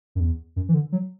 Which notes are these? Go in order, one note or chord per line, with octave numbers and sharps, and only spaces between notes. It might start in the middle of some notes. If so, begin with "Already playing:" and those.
F#2
E2
F#2
E3
D3
F#3